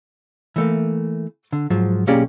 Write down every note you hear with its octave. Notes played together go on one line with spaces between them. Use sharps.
E3 A3 A#3
D3
G#2 F3 F#3
B1 A#3 C#4 G4 G#4 D5